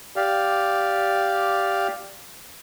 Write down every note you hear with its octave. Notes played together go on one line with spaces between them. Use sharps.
G4 D5 F5